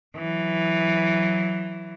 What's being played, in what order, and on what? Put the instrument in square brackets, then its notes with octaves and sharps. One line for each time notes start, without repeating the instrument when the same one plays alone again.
[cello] E3 F#3